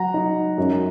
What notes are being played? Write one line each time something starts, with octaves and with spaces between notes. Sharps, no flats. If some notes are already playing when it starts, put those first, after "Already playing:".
Already playing: F#3 F#5 A#5
D#4
F#2